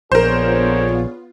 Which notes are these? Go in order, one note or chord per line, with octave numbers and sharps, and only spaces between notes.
A#1 D3 B3 F4 G#4 A#4 C5 C#5